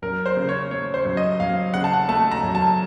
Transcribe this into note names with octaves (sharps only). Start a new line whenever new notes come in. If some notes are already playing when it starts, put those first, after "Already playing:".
F#2 A#4
C5
C#3
C#5
A3 C#5
C5
F#2
D#5
F#2 F5
C#3 F#5
A5
F#5
A3 A5
A#5
F#2
A5